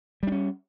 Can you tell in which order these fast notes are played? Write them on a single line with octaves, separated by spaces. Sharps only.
G3 D4 C#4